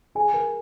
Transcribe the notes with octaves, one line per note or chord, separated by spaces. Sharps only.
G#4 G#5
A#4